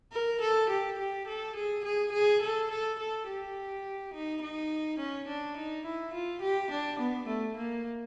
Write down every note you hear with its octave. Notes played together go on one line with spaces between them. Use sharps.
A#4
A4
G4
G4
A4
G#4
G#4
G#4
A4
A4
A4
G4
D#4
D#4
C#4
D4
D#4
E4
F4
G4
D4
B3
A3
A#3